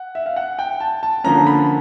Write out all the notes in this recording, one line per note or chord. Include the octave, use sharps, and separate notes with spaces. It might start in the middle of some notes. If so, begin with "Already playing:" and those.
Already playing: F#5
E5
F5
F#5
G5
A5
A5
D3 F3 A#3 C#4 A#5
B5